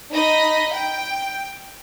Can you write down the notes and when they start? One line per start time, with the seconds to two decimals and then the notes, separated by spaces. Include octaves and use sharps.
0.12 D#4 D#5 B5
0.74 G5